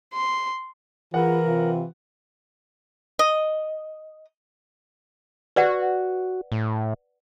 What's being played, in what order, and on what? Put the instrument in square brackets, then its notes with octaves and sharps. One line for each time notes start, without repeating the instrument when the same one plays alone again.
[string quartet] C6
[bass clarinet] E3 [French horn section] F4 G#4 B4 [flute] A#4 [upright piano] F#5
[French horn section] C3 F4
[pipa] D#5
[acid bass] F#4 [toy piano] B4 D5 F#5
[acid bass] A2